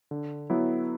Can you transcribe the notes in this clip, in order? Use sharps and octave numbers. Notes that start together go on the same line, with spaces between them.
D3
F#3 B3 E4